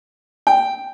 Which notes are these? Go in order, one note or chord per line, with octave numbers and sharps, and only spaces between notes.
G5